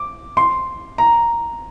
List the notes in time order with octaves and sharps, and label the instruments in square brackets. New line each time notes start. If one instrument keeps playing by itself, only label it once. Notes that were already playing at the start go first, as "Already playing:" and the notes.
Already playing: [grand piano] D6
C6
A#5